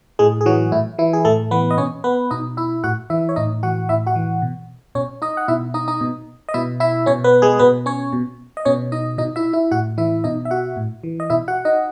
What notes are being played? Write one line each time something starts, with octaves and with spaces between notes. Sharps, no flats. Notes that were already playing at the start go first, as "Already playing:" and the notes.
A2 G#3 G#4
G#4
E3 F#3 F#4
A2 E4
E3 E4
G#4
A2 A3 A4
E3 B3 B4
D#5
B2 C#4 C#5
B3 B4
B2 D#4 D#5
E4 E5
A2 F#4 F#5
E3 E4 E5
C#5
A2 D#4 D#5
E3 F#4 F#5
A2 E4 E5
F#4 F#5
E3
B2
B2 C#4 C#5
D#4 D#5
F#5
B2 E4 E5
D#4 D#5
D#4 D#5
B2
D#5
B2 E4 E5
E4 E5
B2 C#4 C#5
B3 B4
G#3 G#4
B2 B3 B4
C#4 C#5
B2
D#5
B2 C#4 C#5
D#4 D#5
B2 D#4 D#5
E4 E5
E4 E5
A2 F#4 F#5
E3 E4 E5
B2 D#4 D#5
E5
F#4 F#5
A2
E3
D#5
B2 E4 E5
F#4 F#5
D#4 D#5